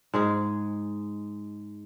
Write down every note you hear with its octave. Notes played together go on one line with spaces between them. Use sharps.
G#2 G#3 G#4